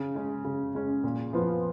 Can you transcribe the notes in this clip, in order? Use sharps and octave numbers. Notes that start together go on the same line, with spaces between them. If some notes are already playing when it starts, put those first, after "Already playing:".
Already playing: C#3
G#3 C#4
C#3
G#3 C#4
A#2
F3 B3 F4